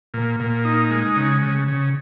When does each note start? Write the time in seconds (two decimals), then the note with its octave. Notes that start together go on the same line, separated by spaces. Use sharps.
0.14 A#2
0.40 A#2
0.65 D#4
0.91 G#3
1.16 C#3
1.42 C#3
1.68 C#3